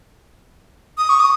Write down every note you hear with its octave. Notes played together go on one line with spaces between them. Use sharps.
D#6
C#6
D#6